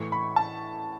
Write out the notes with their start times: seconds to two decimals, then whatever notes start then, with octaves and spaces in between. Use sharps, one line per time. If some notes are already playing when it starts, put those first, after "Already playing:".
Already playing: A2 E3 A3 C#6
0.12 B5
0.36 A5